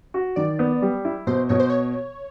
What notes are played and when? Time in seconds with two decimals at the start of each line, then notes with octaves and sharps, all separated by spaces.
0.14 F#4
0.36 D#3 D5
0.59 B3
0.82 G3
1.05 E4
1.27 B2 C5
1.49 B2 C#5
1.60 C5
1.70 C#5